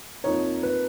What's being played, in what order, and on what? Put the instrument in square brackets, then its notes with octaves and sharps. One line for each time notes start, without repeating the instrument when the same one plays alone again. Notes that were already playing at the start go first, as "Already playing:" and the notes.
[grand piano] F2 F3 A#3 D#4 A#4 [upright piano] C#5
[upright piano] B4